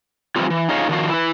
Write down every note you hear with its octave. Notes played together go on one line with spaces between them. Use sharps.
E3 F3 G3 C4 F4
E3
D#4 F4 G#4 C#5 D#5 F5
D#3 F3 F#4 F5
E4 B4